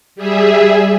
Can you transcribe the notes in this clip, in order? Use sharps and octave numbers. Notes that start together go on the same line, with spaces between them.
G3 G#4 E5